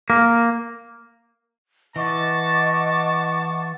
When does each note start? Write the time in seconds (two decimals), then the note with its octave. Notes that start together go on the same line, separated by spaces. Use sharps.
0.10 A#3
1.96 E3 D#5 F#5 A5 C#6 D6